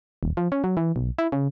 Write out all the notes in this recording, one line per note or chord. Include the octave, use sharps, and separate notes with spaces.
D#1
F3
C#4
F#3
E3
B1
E4
C#3